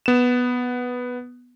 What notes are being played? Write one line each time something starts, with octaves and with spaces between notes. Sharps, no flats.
B3 E7